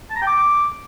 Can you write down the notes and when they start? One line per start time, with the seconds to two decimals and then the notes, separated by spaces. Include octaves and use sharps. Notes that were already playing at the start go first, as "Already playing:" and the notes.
0.10 A5
0.16 A#5
0.21 G5
0.27 D6